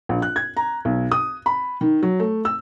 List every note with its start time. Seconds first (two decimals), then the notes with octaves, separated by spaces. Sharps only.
0.09 A#1
0.22 F#6
0.36 G#6
0.57 A#5
0.85 B1
1.12 D#6
1.46 B5
1.81 D#3
2.03 F#3
2.20 A3
2.45 E6